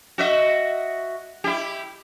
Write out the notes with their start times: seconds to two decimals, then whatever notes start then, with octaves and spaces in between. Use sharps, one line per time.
0.18 F#4 D#5 E5
1.44 E4 G4